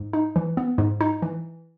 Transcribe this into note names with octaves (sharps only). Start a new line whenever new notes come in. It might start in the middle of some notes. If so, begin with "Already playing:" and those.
Already playing: G#2
D#4
E3
B3
G#2
D#4
E3